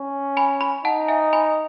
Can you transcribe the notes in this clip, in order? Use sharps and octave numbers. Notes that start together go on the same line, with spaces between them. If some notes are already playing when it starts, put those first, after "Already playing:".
Already playing: C#4
G#5 B5
G#5 B5
D#4 F#5 A5
E5 G#5
G#5 B5